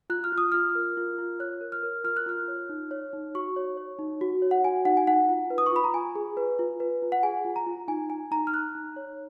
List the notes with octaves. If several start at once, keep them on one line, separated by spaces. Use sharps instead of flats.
F4 F#6
F6
F4
D#6
F4 F6
A#4
F4
F4
C#5 F#6
A#4
F6
A#4
F4 F6
F#6
F4 F6
C#5
D#4
C#5
D#4
F#4 C#6
C#5
C#5
D#4
F#4
C#5
F#5
F#4 G#5
D#4 F#5
G#5
D#4 F#5
F4
B4
D#6
C#6
F4 B5
A#5
F4 G#5
G#4
B4
F4
B4
F4
F#5
G#4 G#5
F4
A#5
F4
D#4 G#5
D#4 G#5
D#4 A#5
F6
D#4 F#6
D#4
C#5